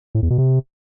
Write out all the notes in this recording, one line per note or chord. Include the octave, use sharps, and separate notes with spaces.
A2
E2
B2
C3